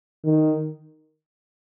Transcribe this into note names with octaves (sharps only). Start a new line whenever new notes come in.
D#3